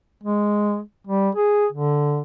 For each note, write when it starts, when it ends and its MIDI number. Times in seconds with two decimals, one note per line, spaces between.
0.24 0.80 56
1.07 1.30 55
1.36 1.67 68
1.72 2.22 50